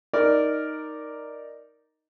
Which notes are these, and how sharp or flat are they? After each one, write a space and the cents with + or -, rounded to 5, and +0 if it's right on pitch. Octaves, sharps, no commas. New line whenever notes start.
D#4 +0 A#4 +0 D5 +0